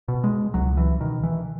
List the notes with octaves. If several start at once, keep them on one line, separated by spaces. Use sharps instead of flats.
B2
G#3
C#2 F#3
E3
B2 D#3
E3